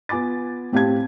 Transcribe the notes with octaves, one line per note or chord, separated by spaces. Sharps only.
B3 F4 G#5 D6 A6
A2 C4 G4 F5 A5 G#6